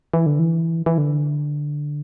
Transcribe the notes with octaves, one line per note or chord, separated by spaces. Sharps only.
E3
D3
E3
E3
D3